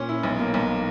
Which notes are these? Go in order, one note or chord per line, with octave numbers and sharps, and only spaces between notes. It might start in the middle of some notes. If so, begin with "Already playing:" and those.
Already playing: A#2 C#4
E4
B1
A#3
B1